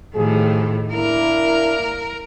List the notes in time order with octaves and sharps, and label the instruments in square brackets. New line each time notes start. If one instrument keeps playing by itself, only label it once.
[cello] A2 D#3 [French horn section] F3 G4 G#4
[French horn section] A#3 D4 E4 [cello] A#4